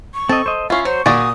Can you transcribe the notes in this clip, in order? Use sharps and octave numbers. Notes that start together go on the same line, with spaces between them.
C#6
C4 A4 D#5
C5 D#5
C#4 E4 F4 F5
F#3 C5 C#6
A#2 F#4 G#4 D5 D#6